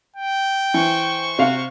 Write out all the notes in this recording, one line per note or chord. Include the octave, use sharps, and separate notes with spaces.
G5
E3 C5 C#6
C3 F#4 F5